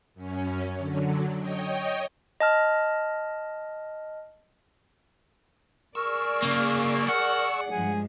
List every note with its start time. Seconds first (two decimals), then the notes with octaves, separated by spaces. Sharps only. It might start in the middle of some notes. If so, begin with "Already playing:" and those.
0.14 F#2 C#4
0.77 D3 F#3
1.38 C#5 D#5 G5
2.40 D#5 A5 F6
5.95 G#4 A#4 D5 C#6 E6
6.42 C#3 A#3
7.08 A#4 F#5
7.71 G2 F3 G#3 G#4